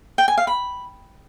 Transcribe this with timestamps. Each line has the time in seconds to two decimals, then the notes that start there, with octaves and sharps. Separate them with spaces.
0.18 G5
0.28 G#5
0.38 F5
0.47 B5